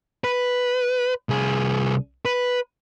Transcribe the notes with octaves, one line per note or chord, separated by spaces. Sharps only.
B4
C2 G#4
B4